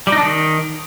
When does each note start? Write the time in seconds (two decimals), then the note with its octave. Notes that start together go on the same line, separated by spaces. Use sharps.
0.07 G3
0.12 D#4
0.18 D4
0.23 D#3